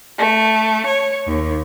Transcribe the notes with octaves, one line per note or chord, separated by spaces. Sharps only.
A3
C#5
D#2